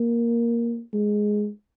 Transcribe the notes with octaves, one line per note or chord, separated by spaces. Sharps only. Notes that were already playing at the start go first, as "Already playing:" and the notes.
Already playing: A#3
G#3